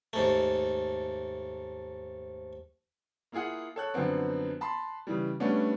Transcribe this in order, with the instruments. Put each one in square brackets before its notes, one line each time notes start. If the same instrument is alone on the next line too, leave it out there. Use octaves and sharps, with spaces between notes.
[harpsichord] D#2 G#2 A3
[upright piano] A#3 E4 F4 G#4 F#5
A4 C#5 F#6
F#2 D3 F3 B3 C4
A5 B5 C6
C#3 E3 G3
G3 A3 B3 C#4 D4